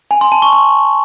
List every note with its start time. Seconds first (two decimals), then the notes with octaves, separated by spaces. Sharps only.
0.11 G#5
0.21 C6
0.32 A5
0.42 C#6
0.53 C#6